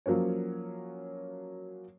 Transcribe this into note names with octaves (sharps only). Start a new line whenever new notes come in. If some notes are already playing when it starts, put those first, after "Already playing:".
F3 F#3 A#3 C#4 C#5